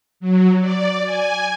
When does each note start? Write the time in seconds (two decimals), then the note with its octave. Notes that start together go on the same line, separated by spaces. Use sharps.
0.20 F#3
0.60 D5
1.04 G#5